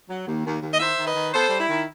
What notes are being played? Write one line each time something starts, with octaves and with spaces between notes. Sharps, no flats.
F#3
D#2
D#2
D#2
D#5
D#3 C5 E5
D#3
B4 D#5
D#3
B3 A4 C5
G3
E4
D#3